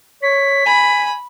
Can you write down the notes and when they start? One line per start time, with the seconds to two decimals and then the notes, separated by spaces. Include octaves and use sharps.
0.23 C#5 B6
0.66 G#5 B5